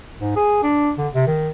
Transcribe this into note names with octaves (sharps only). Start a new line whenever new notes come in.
G#2
G#4
D4
D3
C3
D#3